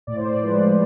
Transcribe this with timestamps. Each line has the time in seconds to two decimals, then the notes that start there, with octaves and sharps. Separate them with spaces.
0.07 A2 D5
0.17 C5
0.25 D5
0.42 F3 G#3 B4